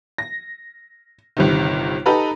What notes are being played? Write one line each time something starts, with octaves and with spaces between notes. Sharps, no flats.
A#6
G1 C3 D#3
D#4 G4 A4 B4 A#5 B5